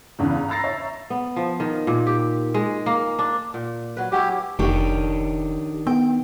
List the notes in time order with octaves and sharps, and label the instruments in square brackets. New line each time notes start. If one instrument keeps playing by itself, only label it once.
[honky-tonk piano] E2 G2 C#3
A#5
A#5 B5 E6 A6 A#6 C7
C#5 E5 A#5
[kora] B3
F3
D#3
A#2
G4
G#3
A#3
D4
A#2
F#3 B4
[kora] F#3 C#4 E4 [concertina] G4
[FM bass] F1 [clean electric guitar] D#3 D4 [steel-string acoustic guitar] G4 C#5
[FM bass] B3 [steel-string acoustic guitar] G5